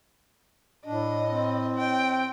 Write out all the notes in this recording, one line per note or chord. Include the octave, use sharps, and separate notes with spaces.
A2 D4 D#5
C4
G5